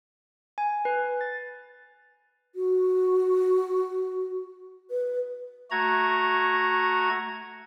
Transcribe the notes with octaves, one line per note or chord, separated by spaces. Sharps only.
G#5
B4
A6
F#4
B4
A3 F#4 A#5 G#6